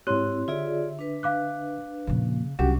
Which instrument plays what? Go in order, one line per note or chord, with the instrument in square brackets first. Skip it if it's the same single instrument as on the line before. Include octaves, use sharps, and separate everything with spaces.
[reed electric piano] G#2 F#6 [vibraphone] C4 E4 [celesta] G4 C#5 C6
[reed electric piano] D3 E5 [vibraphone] F4 G#4 D5
[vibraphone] D4 B4
[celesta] F5 D6 F#6
[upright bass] F2 A#2 [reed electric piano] C#3
[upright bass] C2 [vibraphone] F#3 C#4 D4 [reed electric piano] F#4 G4 F#5